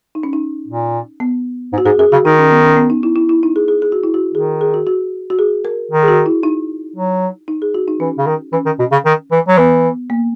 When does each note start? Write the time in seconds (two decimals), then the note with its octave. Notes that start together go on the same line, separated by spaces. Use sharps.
0.15 D#4
0.23 C#4
0.33 D#4
0.68 A#2
1.20 B3
1.73 G#2
1.78 F#4
1.85 G#2 G#4
1.98 F#2 G#4
2.12 C#3 F#4
2.25 D#3 D#4
2.39 C#4
2.50 B3
2.64 C#4
2.77 B3
2.90 D#4
3.03 E4
3.16 E4
3.29 E4
3.43 D#4
3.56 G#4
3.68 G#4
3.82 G#4
3.92 F#4
4.03 E4
4.14 F#4
4.34 D#3 G#4
4.61 G#4
4.74 F#4
4.87 F#4
5.30 F#4
5.39 G#4
5.65 A#4
5.91 D#3
6.03 G#4
6.08 F#4
6.26 E4
6.43 D#4
6.96 F#3
7.48 D#4
7.62 G#4
7.75 F#4
7.88 D#4
8.00 E3 C#4
8.18 C#3
8.27 D#3
8.53 E3 C#4
8.66 D#3
8.79 B2
8.92 C#3
9.05 D#3
9.31 E3
9.48 F#3
9.57 E3 B3
10.10 A#3